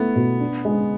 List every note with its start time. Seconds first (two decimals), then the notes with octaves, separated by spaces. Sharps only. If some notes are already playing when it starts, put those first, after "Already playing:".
Already playing: A3 B3 E4
0.16 B2
0.40 D4
0.65 G#3